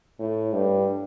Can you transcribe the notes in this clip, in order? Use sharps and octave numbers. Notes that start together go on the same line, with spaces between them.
A2
G2